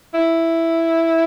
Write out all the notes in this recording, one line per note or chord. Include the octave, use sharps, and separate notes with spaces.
E4